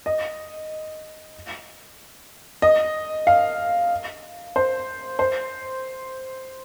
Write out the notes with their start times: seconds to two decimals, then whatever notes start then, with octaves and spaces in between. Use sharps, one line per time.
0.06 D#5
2.62 D#5
3.27 F5
4.56 C5
5.19 C5